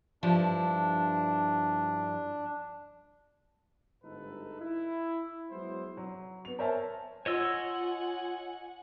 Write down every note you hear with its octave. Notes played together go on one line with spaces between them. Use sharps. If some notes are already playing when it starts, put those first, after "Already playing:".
G2 F3 D4 E4
G1 G#2 A3 D#4 A4 B4
E4
F#3 G#3 B3 E4 C5
F#3
B3 F7
A#4 C5 C#5 E5 G#5 A5
F4 C#5 D#5 F#5 G#5 E6